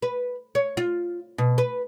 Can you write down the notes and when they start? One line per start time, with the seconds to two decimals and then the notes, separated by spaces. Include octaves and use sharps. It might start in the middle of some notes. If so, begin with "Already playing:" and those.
0.02 B4
0.55 C#5
0.77 F4
1.38 B2
1.58 B4